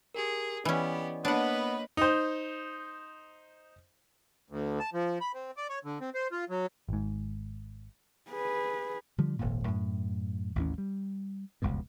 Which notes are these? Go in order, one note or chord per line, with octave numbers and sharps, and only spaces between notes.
G4 G#4 A#4
E3 B3 C#4 G4 D5 D#5
A#3 B3 D4 B4 C#5 D#5 F#5
D#4 C5
D2
A5
F3
B5
C4
D5
C#5
D3
C4
C5
F4
F#3
G#1 G#2
G#4 B4
D3 F3 G3
D#1 G#1 F2 A#2
F#2 A2
A1 D#2 E3 C#4
G3
F1 C#2 G2 B2